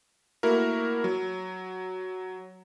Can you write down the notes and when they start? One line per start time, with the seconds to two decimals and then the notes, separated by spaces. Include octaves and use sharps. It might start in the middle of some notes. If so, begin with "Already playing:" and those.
0.43 A3 A#3 E4 F#4 A#4
1.04 F#3